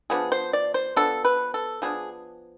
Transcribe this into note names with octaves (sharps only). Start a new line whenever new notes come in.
F3 B3 D4 G#4
C5
D5
C5
F3 B3 D4 A4
B4
A4
F3 B3 D4 G#4